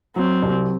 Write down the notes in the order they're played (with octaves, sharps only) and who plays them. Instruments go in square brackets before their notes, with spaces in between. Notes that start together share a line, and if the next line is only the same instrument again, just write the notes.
[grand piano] F#3 [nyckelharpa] C4
[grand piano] C2